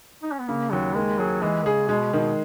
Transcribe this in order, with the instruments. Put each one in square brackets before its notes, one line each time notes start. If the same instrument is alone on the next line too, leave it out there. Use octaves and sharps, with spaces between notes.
[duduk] D#4
C#4
B3
[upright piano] C#3 [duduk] A#3
[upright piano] D#2 [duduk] F#3
[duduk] G#3 [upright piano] A#3
[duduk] F#3 [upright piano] G#4
[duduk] E3 [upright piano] G#3
[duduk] C#3 [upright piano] G#4
[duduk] B2 [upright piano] G#3
[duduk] B2 [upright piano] D#3